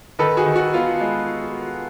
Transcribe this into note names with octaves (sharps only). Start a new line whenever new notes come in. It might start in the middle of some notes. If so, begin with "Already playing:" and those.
D#3 A4 B4
F#4 G#4
D#3
F#4
B3 F4
G#3